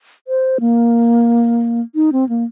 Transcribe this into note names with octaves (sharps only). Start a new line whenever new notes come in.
C5
A#3
D#4
C4
A#3